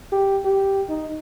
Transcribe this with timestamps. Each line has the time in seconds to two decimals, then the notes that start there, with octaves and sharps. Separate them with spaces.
0.12 G4
0.45 G4
0.89 D#4